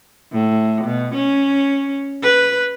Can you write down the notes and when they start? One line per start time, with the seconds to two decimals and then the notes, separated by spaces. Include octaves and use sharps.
0.33 A2
0.84 B2
1.14 C#4
2.23 B4